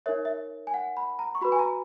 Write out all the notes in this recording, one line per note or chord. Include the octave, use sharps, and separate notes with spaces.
D#4 A#4 C#5 E5
E5
G#5
F#5
B5
A#5
C#6
F#4 B4 B5
G#5
A#5